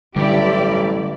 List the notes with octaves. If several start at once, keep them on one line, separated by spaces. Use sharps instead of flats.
A1 G2 D3 F#3 E4 G4 D5